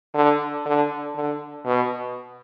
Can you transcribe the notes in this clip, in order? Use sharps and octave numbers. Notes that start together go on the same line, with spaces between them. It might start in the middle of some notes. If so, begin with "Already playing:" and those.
D3
D3
D3
B2